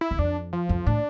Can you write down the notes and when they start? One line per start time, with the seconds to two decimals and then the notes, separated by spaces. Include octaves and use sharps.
0.01 E4
0.11 E2
0.18 F2 D4
0.53 F3
0.69 F2
0.86 A2 D4